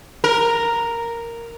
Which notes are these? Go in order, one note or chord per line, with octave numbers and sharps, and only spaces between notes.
A#4